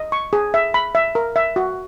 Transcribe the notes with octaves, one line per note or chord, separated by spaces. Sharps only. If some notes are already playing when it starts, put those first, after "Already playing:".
Already playing: D#5
C#6
G#4
E5
B5
E5
A#4
E5
F#4